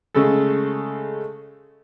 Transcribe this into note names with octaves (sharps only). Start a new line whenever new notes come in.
C#3 G#3 A3 A4